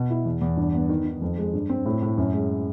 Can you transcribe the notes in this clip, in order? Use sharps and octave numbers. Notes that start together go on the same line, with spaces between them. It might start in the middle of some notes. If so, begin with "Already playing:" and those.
Already playing: B2
E4
E2
E2
G2
B3
D#3
D#3
F2
G#3
G2
C4
A2
A2
F#2
G#3